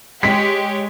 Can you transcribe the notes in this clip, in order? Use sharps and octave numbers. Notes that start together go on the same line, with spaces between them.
G#3 G4 C#5 B6